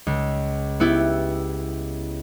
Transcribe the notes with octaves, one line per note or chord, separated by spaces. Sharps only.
C#2
B3 E4 G4